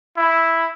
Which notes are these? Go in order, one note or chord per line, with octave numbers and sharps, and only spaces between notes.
E4